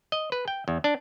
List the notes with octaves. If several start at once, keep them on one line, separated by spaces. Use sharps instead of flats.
D#5
B4
G5
E2
D4